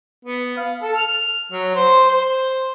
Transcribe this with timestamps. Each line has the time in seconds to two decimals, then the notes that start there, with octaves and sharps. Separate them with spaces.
0.25 B3
0.57 F5
0.82 A4
0.95 F6
1.52 F#3
1.75 C5
2.08 C5